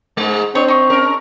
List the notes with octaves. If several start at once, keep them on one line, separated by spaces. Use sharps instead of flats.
G#2 G#3
C4 D4 C#5
D#4 C#6
C#4 A#4